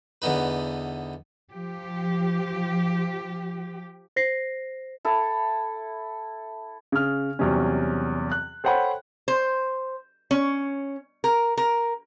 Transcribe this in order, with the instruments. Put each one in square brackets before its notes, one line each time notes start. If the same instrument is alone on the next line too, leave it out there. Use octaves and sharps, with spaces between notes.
[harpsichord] E2 D3 B3 D#4 B4
[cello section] F3 G4
[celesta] C5 A#6 C7
[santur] E4 A4
[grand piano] C#3 F6
E2 C3 F#3 G3 C#4
F#6
A4 C5 C#5 F#5 G5 B5
[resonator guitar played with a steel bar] C5
C#4
A#4
A#4